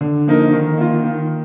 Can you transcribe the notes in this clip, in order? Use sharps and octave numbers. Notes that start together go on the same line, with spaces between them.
D3
F3 A#3 D#4 A#4
D#3
A#3 F4
D#3